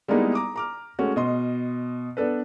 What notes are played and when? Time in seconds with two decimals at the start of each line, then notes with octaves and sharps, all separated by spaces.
0.08 G3 G#3 A#3 B3 D#4 E4
0.34 A#5 D6 D#6
0.56 A#5 D6 F6
0.99 G#3 A3 C#4 F#4
1.16 B2 D#5 C6
2.17 B3 D4 A4 B4